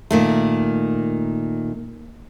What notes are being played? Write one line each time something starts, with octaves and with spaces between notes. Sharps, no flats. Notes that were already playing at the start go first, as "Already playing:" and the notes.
A#2 D#3 A3